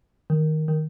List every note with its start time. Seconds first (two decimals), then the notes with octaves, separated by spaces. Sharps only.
0.30 D#3
0.68 D#3